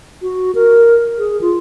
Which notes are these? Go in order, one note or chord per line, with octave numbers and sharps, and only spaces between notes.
F#4
A#4
G#4
F4